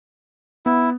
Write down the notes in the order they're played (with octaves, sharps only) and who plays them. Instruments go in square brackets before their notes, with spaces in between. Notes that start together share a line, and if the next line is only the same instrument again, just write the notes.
[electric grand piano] B3 [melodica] E4